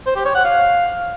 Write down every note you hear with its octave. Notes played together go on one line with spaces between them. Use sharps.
C5
G4
C#5
F#5
F5